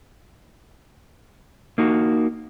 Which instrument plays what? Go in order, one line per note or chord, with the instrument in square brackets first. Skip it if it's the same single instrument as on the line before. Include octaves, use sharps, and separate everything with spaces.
[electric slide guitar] A#3 D#4 F#4